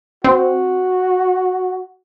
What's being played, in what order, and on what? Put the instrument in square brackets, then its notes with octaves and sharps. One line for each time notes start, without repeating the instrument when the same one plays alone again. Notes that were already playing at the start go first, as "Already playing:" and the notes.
[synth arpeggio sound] C4 [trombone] F#4